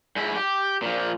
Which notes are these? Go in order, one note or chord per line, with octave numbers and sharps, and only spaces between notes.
G#2 E4
G4
A#2 F3